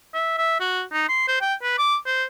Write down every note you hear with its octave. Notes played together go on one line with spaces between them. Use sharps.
E5
E5
F#4
D#4
C6
C5
G5
B4
D6
C5